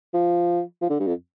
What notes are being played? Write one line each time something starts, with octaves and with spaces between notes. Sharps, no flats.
F3
F3
D3
G2
F2